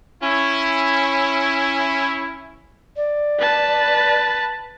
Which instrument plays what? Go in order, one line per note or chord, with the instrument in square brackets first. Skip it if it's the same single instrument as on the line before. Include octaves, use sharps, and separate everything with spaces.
[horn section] C#4 E4
[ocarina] D5
[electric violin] B4 A5